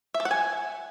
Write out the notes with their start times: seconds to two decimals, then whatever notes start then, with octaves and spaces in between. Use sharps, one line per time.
0.14 E5
0.20 A4
0.25 F#5
0.31 G#5